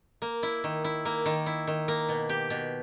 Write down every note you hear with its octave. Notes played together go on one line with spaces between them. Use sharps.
A#3
E4
D#3
E4
A#3
D#3
E4
D#3
A#3
B2
G4
B2